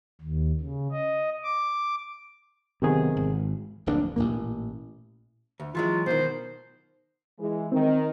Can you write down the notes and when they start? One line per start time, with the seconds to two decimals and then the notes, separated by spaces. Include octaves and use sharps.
0.21 D#2
0.60 C#3
0.92 D#5
1.44 D6
2.82 B1 C3 D#3 B3 G#4
3.17 G#1
3.86 D1 A#1 F#2 D4
4.16 A1 A#2 D3 A#3
5.60 D2
5.75 E3 F#3 G#3 F4
6.06 B2 D#3 C5
7.39 E3 G#3
7.72 D#3 C4